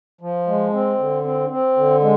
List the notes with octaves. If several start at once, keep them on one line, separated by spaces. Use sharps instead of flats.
F3
G#3
C4
D3
C4
C4
D3
G#3